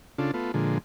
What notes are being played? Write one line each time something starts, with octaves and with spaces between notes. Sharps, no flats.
C#3 D4 F4 A4
A3 B3 F4
A#2 D3 F3 G#3